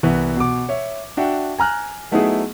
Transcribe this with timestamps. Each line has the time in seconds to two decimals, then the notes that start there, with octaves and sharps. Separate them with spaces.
0.03 C2 E3 B3 B4
0.36 B2 D6
0.69 C#5 E5
1.17 D4 F#4 E5 G5
1.59 G#5 A#5 F6 F#6
2.11 F#3 A3 B3 D#4 E4 G#4